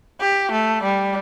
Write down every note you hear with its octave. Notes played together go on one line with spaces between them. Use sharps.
G4
A3
G3